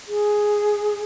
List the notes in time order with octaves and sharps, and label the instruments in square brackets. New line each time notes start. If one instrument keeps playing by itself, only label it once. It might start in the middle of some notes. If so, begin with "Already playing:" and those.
[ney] G#4